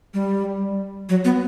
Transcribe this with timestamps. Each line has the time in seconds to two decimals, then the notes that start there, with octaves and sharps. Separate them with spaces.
0.14 G3
1.09 F#3
1.25 B3